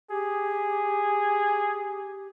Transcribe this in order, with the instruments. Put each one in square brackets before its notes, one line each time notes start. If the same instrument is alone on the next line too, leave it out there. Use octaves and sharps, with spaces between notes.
[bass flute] G4 [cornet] G#4